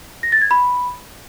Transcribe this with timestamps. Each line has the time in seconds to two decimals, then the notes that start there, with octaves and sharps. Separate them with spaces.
0.23 A#6
0.32 A6
0.42 G#6
0.51 B5